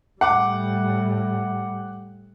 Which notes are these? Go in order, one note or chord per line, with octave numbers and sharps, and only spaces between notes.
A2 G3 F#5 D6